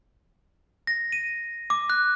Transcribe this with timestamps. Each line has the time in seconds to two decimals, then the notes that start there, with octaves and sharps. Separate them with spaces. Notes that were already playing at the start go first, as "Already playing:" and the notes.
0.87 A#6
1.12 D#7
1.70 D6
1.90 F#6